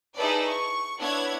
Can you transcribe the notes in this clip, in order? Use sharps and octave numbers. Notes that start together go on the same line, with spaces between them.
D#4 E4 G#4 A4 B4 D5
C#6
B3 D4 E4 C#5 F#5 G#6